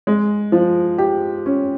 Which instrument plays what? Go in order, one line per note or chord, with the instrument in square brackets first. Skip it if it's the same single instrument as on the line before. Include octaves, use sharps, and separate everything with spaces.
[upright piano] G#3
F3
G4
C#4